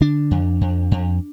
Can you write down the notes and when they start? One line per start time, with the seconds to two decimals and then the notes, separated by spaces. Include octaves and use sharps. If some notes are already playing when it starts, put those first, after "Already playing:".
0.01 D3 D4
0.31 F2
0.61 F2
0.91 F2